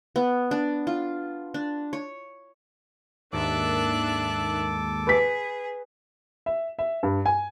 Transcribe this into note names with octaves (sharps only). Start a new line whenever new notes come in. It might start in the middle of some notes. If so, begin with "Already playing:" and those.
B3
D4
F4
D4
C#5
D#2 G#2 D#3 D4 A4 E5 D6 F#6
G#4 B4 B6
E5
E5
G2
G#5